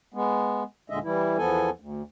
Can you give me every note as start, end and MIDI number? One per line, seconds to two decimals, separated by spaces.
0.14 0.63 56
0.14 0.63 59
0.90 0.99 39
0.90 0.99 46
0.90 0.99 50
0.90 0.99 56
0.90 0.99 75
0.90 0.99 76
1.04 1.37 52
1.04 1.37 55
1.04 1.37 64
1.38 1.70 40
1.38 1.70 53
1.38 1.70 59
1.38 1.70 69
1.38 1.70 80
1.80 2.02 38